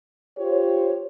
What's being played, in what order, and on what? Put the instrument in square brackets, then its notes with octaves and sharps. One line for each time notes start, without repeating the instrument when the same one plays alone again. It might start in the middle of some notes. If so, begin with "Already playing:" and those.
[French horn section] F4 G4 C5 C#5